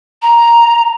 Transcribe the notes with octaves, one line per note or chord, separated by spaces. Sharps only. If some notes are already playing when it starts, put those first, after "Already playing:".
A#5